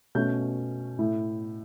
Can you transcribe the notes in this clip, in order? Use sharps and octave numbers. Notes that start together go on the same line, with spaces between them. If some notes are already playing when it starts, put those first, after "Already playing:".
B2 A3 C#4 G6
A2